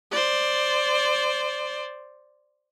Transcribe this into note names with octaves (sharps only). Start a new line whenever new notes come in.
C5 D5